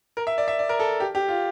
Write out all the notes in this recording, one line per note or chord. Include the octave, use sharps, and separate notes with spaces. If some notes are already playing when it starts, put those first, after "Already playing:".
A#4
E5
D5
E5
D5
A#4
A4
G4
G4
F4